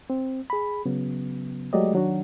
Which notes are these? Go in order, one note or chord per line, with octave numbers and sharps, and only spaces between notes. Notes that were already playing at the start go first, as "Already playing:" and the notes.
C4
G#4 B5
C#3 F#3 B3
F#3 G#3 A3 G4 D5 D#5
D#3 F#3 D4 F#4